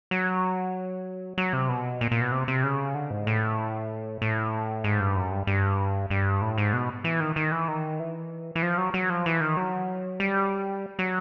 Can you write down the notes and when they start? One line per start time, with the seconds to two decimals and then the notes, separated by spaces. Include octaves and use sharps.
0.11 F#3
1.38 F#3
1.53 C3
1.69 B2
2.01 A#2
2.12 A#2
2.21 B2
2.32 C3
2.48 C3
2.63 C#3
2.95 D3
3.11 G#2
3.27 A2
4.22 A2
4.84 G#2
5.00 G2
5.16 F#2
5.31 G2
5.47 G2
6.10 G2
6.42 A2
6.58 G#2
6.73 B2
7.04 E3
7.20 D#3
7.36 D#3
7.52 E3
7.68 D#3
7.99 E3
8.55 E3
8.62 F3
8.78 F#3
8.94 F#3
9.10 F3
9.26 E3
9.41 D#3
9.57 F#3
10.20 G3
10.99 F#3